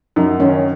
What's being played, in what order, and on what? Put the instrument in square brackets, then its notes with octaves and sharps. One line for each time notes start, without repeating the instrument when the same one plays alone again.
[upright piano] F#2 [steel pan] D#4
[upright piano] D#3 [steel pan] C#4